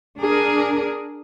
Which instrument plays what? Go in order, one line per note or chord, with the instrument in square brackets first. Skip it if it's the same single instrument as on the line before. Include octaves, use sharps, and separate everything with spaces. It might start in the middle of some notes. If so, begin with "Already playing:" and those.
[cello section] D4 G#4 A#4